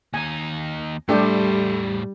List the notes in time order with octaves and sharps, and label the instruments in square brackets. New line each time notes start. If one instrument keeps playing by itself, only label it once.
[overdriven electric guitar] D#2 D#4 [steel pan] G#5
[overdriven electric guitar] A2 C5 [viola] G3 [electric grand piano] A3 [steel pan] D4 G4